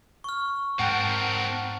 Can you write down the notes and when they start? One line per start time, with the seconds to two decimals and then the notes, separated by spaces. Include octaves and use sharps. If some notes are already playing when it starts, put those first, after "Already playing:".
0.24 C#6 F6
0.79 G#2 C4 A#4 F#5 G5 A5